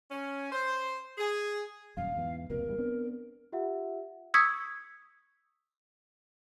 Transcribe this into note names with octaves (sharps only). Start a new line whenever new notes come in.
C#4
C5
G#4
D#1 F#2 F5
E2 G#2 E3
F1 C#2 B2 A#4
E2 G2 G3
B3 C4 D4
F4 G4 E5 F#5
C#6 D#6 E6 G#6 B6 C#7